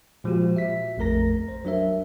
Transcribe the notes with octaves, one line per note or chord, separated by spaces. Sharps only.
A#2 F3 G#3 F#4 G4
E5 B6
A#1 F2 A3 A#4 A#5 A#6
C5
F#3 D4 A#4 E5